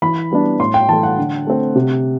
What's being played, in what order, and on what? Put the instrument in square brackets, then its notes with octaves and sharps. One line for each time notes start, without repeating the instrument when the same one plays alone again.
[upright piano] E3 B5
G3 B3 D4
A2 C6
G5
E3 A3 A5
F#5
D3
A3 C4
C3